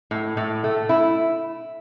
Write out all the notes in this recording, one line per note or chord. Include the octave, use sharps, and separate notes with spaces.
A2
A2
A3
E4